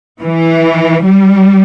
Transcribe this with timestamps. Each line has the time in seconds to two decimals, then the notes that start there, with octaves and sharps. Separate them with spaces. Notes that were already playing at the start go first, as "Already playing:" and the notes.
0.22 E3
1.04 G3